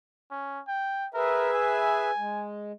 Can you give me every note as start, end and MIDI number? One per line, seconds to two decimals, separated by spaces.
0.31 0.60 61
0.67 1.07 79
1.14 2.11 68
1.14 1.49 70
1.14 2.11 71
1.14 2.11 76
1.54 2.46 80
2.17 2.72 56